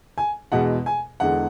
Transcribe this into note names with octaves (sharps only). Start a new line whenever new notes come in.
G#5
E2 B2 G#3 F#5
G#5
E1 E2 D3 G#3 F#5